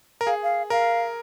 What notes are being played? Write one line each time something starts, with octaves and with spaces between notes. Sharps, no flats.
A#4
G#4 F5
F5
A#4 F5